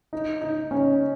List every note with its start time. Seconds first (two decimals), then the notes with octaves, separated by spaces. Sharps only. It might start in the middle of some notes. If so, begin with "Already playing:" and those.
0.13 D#4
0.41 D#4
0.71 C#4